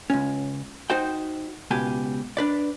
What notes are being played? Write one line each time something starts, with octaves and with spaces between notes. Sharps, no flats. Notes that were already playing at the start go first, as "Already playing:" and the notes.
C#2 C#4
D#4 F#4 C5 G5
C#2 B2 G4 G#5
D4 B4 D5